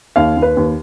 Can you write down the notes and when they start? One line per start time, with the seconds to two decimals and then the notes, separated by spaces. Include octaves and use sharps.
0.16 D#2 F5
0.37 D#2
0.42 B4
0.57 D#2